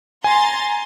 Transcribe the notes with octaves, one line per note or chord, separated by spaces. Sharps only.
G#5 A#5 C6 A6